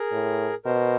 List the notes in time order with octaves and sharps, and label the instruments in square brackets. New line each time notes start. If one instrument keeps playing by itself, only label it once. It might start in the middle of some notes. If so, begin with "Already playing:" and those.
Already playing: [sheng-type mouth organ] G#4 A#4
[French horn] A2
[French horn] B2 [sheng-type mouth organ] A#4 C5